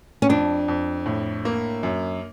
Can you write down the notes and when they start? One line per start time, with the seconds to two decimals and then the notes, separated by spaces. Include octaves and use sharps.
0.22 C#4
0.29 F2 D4
0.68 F2
1.06 A2
1.45 A#3
1.83 F#2